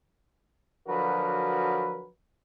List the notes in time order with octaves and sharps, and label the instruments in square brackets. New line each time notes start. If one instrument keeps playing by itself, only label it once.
[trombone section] D3 F3 F#3 F#4 A#4 B4